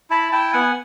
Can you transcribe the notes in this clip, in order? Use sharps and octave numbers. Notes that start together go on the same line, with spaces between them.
E4 A5 B5
E4 G5 A5
B3 F#5 G#5